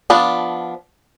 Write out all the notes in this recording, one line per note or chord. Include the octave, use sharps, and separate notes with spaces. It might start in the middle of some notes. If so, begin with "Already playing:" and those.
F3 B3 D4